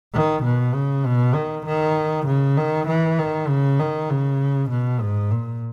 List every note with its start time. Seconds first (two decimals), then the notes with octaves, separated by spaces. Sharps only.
0.14 D#3
0.44 B2
0.74 C#3
1.05 B2
1.35 D#3
1.66 D#3
2.26 C#3
2.57 D#3
2.88 E3
3.19 D#3
3.48 C#3
3.80 D#3
4.10 C#3
4.70 B2
5.01 G#2
5.31 A#2